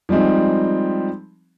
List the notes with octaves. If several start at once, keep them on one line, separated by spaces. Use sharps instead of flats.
F3 G3 G#3 C4 D#4